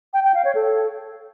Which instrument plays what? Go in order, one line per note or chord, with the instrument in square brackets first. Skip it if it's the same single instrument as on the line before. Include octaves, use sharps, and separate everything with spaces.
[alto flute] G5
G5
F5
C#5
A4